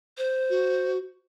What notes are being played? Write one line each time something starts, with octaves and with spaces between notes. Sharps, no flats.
C5
F#4